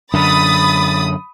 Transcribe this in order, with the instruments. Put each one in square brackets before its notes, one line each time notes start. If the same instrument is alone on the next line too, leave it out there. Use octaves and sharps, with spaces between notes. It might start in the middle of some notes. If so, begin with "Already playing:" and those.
[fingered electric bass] F#2 D3 [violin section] B5 D#6 A6